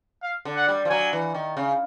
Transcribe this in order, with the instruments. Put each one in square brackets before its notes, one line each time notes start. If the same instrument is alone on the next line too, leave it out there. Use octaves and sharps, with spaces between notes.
[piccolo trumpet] F5
[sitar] D3
[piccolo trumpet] F#5
[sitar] G3
F3
[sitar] F#3 [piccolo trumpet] G#5
[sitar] E3
D#3
C#3